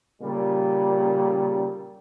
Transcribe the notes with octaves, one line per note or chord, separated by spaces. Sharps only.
A#2 C#3 G3